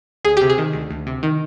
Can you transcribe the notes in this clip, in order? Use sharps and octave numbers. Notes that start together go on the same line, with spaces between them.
D2 G#4
C3 G4
G#4
D#3
D2
D2
C3
D#3